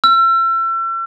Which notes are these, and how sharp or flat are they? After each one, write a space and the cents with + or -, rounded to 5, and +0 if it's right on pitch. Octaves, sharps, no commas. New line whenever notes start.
E6 +40